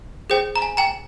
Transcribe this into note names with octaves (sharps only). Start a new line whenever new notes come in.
G#4 C5 G5
A#5
G#5
G5 A#5